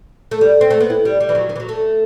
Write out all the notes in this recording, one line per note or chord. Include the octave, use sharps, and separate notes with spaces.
A3
G3
C4
A3
B3
E4
G3
G3
E3
F#3
D#3
E3
F#3
A3